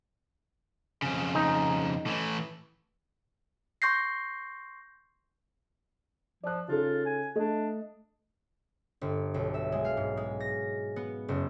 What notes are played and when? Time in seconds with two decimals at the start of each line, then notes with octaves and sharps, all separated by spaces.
1.02 F2 C#3
1.35 D#4
2.06 A2 E3
3.82 C6 C#6 G6 A#6 C7
6.43 F3 D5 F#6
6.68 C#3 D#4 F4 A4
7.06 G#5
7.35 A3 D4 D#5
9.01 G1
9.34 B1
9.54 E5
9.72 G#3
9.85 F5
9.97 G#2
10.17 G#3
10.40 A#6
10.96 B3
11.28 F#1